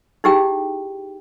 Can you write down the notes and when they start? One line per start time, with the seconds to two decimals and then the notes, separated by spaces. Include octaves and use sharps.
0.24 D#4 E4 G4 G#4 G5